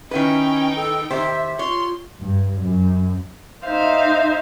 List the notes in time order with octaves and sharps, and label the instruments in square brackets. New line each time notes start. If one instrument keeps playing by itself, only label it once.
[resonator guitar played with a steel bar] D#3 E4 B4 [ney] C#4 [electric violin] D#4 G5
[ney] A4
[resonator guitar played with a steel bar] D#3 G4 C5 [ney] E5
[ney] F4 [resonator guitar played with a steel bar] C#5 [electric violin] C6
[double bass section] G2
F#2
[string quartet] D#4 C5 E5 F5